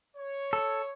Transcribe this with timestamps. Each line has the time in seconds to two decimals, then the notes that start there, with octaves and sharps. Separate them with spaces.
0.16 C#5
0.53 A4